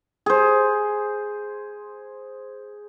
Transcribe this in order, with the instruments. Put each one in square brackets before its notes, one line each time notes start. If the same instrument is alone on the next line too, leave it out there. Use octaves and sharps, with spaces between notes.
[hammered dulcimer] G#4 C5